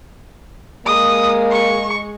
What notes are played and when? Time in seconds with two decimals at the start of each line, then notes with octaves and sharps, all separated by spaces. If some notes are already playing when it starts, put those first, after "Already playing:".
0.86 G#3 A#3 D#6
1.51 C#6